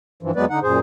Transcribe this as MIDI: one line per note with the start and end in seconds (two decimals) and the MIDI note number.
0.23 0.31 43
0.23 0.31 52
0.23 0.31 53
0.36 0.45 41
0.36 0.45 54
0.36 0.45 56
0.36 0.45 59
0.36 0.45 71
0.36 0.45 74
0.50 0.59 50
0.50 0.59 63
0.50 0.59 78
0.63 0.80 42
0.63 0.80 46
0.63 0.80 68
0.63 0.80 72